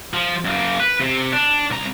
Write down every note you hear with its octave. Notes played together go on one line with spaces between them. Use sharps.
F3
F#2 A#3
B4
C3
D4
C2 A#5